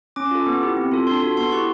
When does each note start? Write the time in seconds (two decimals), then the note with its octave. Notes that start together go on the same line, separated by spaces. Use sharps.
0.16 C#4 D6
0.31 F4 A4
0.46 B3
0.61 E4 G4
0.77 C4
0.92 F4 A4
1.07 D4 C6
1.22 F#4 A4
1.37 B3 C6
1.52 E4 G4 C#6